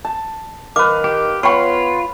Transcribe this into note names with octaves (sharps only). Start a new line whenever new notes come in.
A5
D#3 B4 F5 D6
G4
B3 F4 C#5 G5 B5 C#6